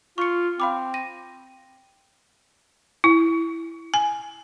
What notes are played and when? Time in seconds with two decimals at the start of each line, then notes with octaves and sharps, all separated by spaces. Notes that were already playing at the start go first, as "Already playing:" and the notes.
0.18 F4 C#6 C#7
0.60 C4 F5 B5 D6
0.94 A#6 D#7
3.04 E4
3.94 G#5